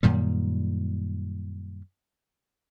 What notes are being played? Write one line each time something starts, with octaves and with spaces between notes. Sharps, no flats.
F#2 A#2 D#3 G3